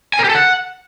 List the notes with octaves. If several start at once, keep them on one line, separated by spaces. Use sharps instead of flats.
G#5
A#4
G4
A4
F#5